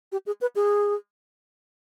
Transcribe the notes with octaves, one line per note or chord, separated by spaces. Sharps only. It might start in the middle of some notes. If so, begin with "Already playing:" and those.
G4
G#4
B4
G#4